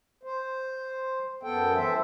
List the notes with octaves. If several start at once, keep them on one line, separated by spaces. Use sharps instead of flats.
C5
F#2 B3 A4 G5
E3 A4 C5 E5